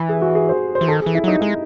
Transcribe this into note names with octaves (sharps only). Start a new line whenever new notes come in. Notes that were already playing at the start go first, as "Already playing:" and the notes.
Already playing: E3
G#4
F#4
G#4
C5
C5
E3
D#3 A4
G#4
E3
E4
F#3 D#4
G#3 D#4